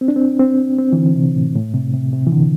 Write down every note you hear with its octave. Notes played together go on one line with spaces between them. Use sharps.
C4
D4
C4
C4
C4
E3
D3
C3
A2
A2
C3
C3
C3
E3
D3